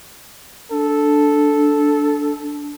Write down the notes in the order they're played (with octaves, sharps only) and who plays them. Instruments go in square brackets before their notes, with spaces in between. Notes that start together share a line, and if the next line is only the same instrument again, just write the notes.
[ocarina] D4 [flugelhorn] A4